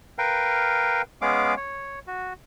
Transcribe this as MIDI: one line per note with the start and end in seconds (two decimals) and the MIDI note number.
0.18 1.02 70
0.18 1.02 71
0.18 1.02 77
0.18 1.02 79
1.22 1.55 56
1.22 1.55 59
1.22 1.55 61
1.22 1.55 68
1.22 1.55 77
1.22 1.55 86
1.57 1.99 73
2.07 2.33 66